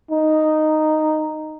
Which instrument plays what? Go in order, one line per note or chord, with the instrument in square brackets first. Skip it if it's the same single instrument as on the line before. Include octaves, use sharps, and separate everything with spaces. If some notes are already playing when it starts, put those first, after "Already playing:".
[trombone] D#4